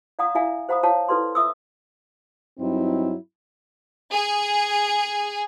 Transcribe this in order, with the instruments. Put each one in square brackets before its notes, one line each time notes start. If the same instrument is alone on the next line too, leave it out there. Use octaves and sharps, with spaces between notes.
[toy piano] D5 F5 F#5 A#5 D#6
E4 D5 E5 F5 G#5 A#5
C5 F5 F#5 A#5 B5 D#6
C#5 F5 A5 A#5 C#6
E4 A4 B4 D5 C6
E5 D#6 E6
[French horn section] G2 F#3 C4 D#4 E4
[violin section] G#4